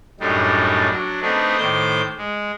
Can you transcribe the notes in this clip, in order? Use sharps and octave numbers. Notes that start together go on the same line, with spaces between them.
F#2 A2 G3 D4 D#4
F#3 D4
A3 B3 C4 D4 D#4 G#4
A2 D#3 C5 D6 G6
G#3